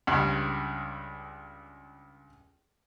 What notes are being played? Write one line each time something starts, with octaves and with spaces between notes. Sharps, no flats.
C#2 G2